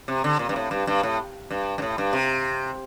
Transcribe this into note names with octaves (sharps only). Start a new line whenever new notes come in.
C3
D3
A#2
G2
A2
G2
G2
A2
G2
G2
A2
G2
C3